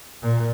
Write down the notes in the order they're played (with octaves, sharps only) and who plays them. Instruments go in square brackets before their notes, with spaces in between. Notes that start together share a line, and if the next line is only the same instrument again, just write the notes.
[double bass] A#2